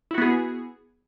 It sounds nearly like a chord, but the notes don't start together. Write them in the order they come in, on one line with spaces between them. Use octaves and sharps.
E4 F#4 B3 G#4